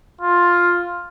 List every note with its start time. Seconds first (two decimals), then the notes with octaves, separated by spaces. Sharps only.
0.21 F4